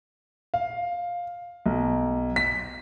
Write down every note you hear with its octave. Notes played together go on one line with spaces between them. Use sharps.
F5
B1
B6